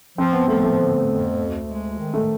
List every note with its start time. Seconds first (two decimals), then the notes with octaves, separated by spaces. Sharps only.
0.18 F3 C4
0.33 B3
0.48 F3 A3
0.63 A3
0.78 D3
1.08 F2
1.38 D2
1.68 G#3
1.98 D#3
2.14 A3